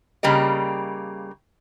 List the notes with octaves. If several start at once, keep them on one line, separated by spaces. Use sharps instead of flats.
C#3 G3 A#3 G4 D#5